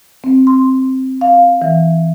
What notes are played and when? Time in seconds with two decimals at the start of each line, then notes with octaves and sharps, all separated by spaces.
0.24 C4
0.47 C6
1.21 F5
1.62 E3